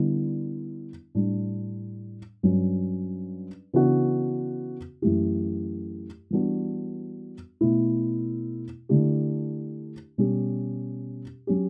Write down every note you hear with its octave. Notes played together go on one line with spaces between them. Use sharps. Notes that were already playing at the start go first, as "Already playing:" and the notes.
Already playing: D3 G3 B3 E4
A2 G3 D4
G2 F#3 C#4
C#3 E3 B3 D4 F#4
F#2 E3 A3 E4 G4
E3 G3 B3 D4 F#4
B2 A3 E4
D3 A3 E4 G4
B2 G3 C#4 G4
F#3 C#4 G4